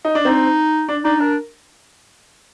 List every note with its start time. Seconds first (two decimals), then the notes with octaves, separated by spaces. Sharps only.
0.05 D#4
0.15 D4
0.25 C4 D#4
0.89 D4
1.04 D4 D#4
1.20 D4 A#4